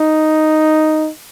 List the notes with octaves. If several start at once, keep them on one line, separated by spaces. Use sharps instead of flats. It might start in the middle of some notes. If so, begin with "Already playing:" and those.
Already playing: D#4